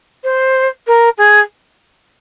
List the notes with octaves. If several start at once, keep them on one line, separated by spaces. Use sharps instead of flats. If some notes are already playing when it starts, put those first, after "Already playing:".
C5
A#4
G#4